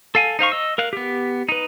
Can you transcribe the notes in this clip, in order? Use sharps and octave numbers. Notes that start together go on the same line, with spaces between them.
A4 F5 G#5
D#4 C5 F5 C#6
D#5 E6
A#4 F5 F#6
B3 G4
D#4 B4